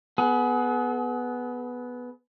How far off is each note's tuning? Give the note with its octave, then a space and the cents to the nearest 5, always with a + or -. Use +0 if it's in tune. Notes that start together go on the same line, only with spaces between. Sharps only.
B3 +0 G#4 +30